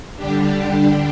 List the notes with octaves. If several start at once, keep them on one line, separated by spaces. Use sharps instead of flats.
D3 G3 D4 G4